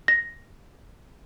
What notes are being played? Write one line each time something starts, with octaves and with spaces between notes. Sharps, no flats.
A#6